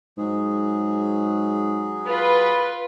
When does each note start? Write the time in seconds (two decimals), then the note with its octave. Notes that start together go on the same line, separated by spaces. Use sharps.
0.18 G#2 F#3 G#4
2.07 F4 B4